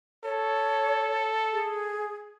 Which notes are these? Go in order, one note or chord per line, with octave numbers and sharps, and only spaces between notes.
A4 C#5
G#4